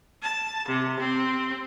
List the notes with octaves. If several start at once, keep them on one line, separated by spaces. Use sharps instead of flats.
A5
C3
C4